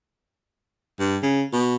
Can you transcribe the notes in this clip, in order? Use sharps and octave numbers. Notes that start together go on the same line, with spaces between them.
G2
C#3
B2